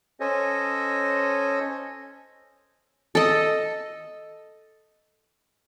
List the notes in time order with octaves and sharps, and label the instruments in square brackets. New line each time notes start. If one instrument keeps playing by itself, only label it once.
[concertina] C#4 A4 C5 C#5 D#5
[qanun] A4 D#5